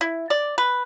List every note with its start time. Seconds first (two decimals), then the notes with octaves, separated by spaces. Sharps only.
0.01 E4
0.30 D5
0.58 B4